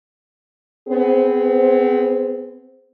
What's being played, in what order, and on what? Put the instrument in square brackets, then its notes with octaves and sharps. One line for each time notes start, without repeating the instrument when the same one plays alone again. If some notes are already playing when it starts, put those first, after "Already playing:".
[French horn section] B3 C4 G#4 C5